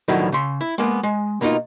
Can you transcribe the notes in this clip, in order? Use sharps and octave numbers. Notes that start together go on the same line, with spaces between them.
A2 D3 D#3 F3 F#3 E4
C#3 C6
E4
G#3 A#3 B3
G#3
B2 A#3 D4 D#4 F4